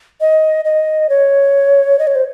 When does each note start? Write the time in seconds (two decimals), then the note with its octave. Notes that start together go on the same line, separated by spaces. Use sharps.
0.21 D#5
0.65 D#5
1.09 C#5
1.99 D#5
2.07 C#5
2.15 C5